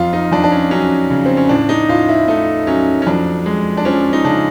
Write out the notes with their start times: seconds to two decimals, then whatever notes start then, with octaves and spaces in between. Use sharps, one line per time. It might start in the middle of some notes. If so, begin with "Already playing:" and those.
Already playing: F2 F4
0.13 D#4
0.32 F2 D4
0.44 D4
0.52 C#4
0.71 F#3 C#4
1.10 C#3
1.26 C4
1.37 C#4
1.49 A2 D4
1.69 D#4
1.89 A2 F4
2.09 E4
2.28 A3 D#4
2.67 F#3 C#4
3.02 C#4
3.06 F2 D4
3.46 G#3
3.77 D4
3.85 F3 C#4
4.13 D#4
4.24 C#3 D4